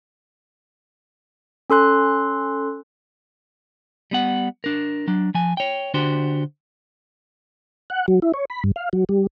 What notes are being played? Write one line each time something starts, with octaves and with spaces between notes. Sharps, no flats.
C#4 A4 C6 F#6
G3 B3 F#5
D4 A#4
F#3 D4
F3 G#5
C#5 G5
D3 D4 F#4 G4 C5
F#5
F#3
E4
C#5
B5
G2
F5
F#3
G3